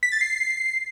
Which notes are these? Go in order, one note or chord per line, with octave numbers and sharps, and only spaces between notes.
B6
A6
C7